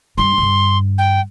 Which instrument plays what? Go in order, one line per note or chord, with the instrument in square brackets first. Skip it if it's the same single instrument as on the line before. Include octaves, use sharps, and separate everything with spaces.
[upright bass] G2 D4 [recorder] C6
[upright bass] G2 D3
[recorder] G5